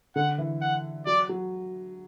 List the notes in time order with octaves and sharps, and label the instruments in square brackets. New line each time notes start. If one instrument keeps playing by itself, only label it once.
[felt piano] D3 [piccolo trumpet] F#5
[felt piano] E3
[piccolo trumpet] F#5
[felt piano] F#3 [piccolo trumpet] D5
[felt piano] F#3